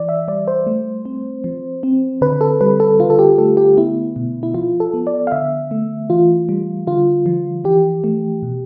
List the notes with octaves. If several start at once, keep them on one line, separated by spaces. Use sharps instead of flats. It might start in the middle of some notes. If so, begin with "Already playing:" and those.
Already playing: E3 D5
E5
G3 D5
C5
A3
C4
F3
C4
D3 B4
A4
G3 B4
A4
D3 F4
A4
G4
A3 A4
G4
B3 E4
B2
E4
F3 F4
A4
B3
D5
F5
D3 E5
A3
E3 F4
G3
D3 F4
F3
E3 G4
A3
B2